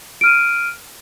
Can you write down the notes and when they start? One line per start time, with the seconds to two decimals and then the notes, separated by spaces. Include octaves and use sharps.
0.21 D7
0.24 F6
0.26 D#7